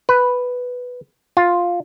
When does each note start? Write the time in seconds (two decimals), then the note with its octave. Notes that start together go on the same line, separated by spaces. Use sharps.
0.09 B4
1.37 F4